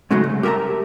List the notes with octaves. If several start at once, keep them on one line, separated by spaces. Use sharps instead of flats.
G#2 C#3 F#3 G#3 A3
C2
G4 A#4 E5 A5 A#5